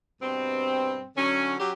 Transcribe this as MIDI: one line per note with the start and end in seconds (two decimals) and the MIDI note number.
0.22 1.06 43
0.22 1.06 47
0.22 1.06 60
1.16 1.55 50
1.16 1.55 54
1.16 1.55 61
1.59 1.72 54
1.59 1.72 61
1.59 1.72 67